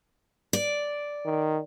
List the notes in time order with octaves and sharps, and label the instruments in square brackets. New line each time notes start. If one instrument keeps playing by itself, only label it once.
[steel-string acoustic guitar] D5
[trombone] D#3